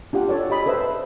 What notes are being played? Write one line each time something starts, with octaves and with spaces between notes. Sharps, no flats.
D4 F4 G4 F#5
A4 C#5 D5
G4 D#5 B5 D#6
A4 B4 C5 E5 E6